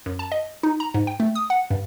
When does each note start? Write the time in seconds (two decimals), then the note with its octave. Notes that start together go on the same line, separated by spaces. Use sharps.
0.06 F#2
0.19 A5
0.32 D#5
0.63 D#4
0.80 A#5
0.94 G#2
1.07 G5
1.20 A3
1.35 D#6
1.50 F#5
1.70 G2